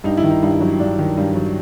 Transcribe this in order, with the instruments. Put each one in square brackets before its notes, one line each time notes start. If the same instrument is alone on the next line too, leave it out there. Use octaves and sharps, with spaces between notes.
[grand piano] G2 D#4
E4
D#3
D#4
G2
F#3
G2 D4
D#3
G2
F#3